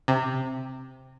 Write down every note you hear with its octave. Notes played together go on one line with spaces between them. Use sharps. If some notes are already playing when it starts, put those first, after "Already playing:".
C3